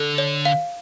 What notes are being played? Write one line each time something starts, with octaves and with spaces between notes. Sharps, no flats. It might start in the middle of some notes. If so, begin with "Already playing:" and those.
Already playing: D3 A4
C#5
F5